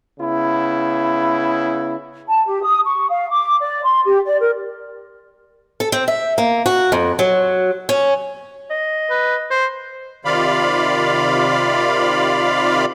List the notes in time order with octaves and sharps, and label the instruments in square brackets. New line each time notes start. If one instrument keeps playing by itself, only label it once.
[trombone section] C#3 B3 E4
[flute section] A5
G4
D#6
C#6
F5
D6
D5
C6
G4
D5
A#4
[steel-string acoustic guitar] A4
C4
E5
A#3
F#4
F2
F#3
C#4
[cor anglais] D#5
[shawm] B4
C5
[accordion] C3 D#3 F4 D5 F5 B5